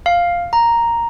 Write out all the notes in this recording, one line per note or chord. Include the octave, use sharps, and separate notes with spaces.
F5
A#5